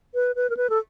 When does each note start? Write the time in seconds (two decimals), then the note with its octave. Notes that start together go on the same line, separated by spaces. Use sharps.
0.15 B4
0.36 B4
0.50 A#4
0.57 B4
0.70 A4